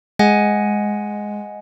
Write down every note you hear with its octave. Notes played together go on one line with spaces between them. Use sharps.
G#3 D#5 F#5 G#5